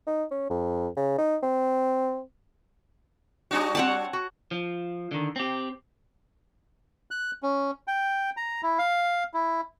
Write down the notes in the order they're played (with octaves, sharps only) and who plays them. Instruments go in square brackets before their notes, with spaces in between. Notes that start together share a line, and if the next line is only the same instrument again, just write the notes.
[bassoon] D#4
C#4
F2
C#3
D#4
C4
[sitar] G3 D4 F#4 [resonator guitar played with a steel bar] D#4 C#5
[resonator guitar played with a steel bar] C4 G5 [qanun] C#5 F#5 A5
[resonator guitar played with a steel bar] F#4
[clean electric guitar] F3
D3 D#3
C4 G4
[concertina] F#6
C#4
G5
A#5
E4
F5
E4